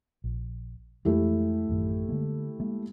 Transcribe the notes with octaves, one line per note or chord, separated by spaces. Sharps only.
A#1
F2 E3 G#3 A3 E4 G4
A1 F#2 D#3
D3 G#3 A#3
G#3 A#3